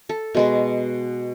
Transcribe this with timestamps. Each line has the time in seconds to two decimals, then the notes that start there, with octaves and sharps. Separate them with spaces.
0.09 A4
0.34 B2 G#3 B4